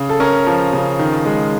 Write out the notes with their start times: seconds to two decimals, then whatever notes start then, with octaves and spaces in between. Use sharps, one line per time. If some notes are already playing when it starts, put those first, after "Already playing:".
Already playing: C#3
0.09 A4
0.20 C#4 A#4
0.46 F3
0.73 C#3
0.99 D#3
1.25 G#3